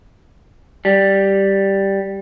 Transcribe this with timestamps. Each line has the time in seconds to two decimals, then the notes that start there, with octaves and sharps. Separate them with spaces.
0.85 G3